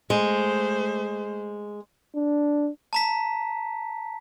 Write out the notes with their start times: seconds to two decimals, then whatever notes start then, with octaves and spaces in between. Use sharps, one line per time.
0.10 G#3 A3 C5
2.15 D4
2.93 A5 A#5 B6